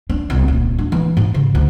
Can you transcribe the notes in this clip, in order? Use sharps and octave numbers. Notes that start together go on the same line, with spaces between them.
D4
C2
D#1
D4
E3
G#2
C#3
D2